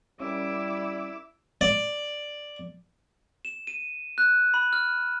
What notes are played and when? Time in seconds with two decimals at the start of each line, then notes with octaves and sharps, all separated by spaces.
0.20 G3 C#4 E4 A#4 D6 E6
1.61 D5
3.45 E7
3.67 D#7
4.18 F#6
4.54 B5
4.73 F6